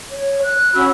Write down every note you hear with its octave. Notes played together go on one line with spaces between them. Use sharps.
C#5
F#6
C#4 F#4 B5 E6